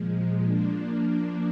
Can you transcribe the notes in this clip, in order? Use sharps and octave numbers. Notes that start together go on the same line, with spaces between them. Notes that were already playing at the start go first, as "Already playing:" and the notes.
Already playing: A#2 F3 G#3
F3 A#3 D4